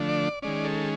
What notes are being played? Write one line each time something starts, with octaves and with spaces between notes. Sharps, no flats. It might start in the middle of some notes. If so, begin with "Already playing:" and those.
Already playing: D3 F3 A3 D4
D5
D#3 G#3 C#4 D5
A4